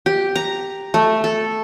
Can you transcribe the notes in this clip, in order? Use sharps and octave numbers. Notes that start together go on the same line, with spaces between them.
G4
A#5
A3
A4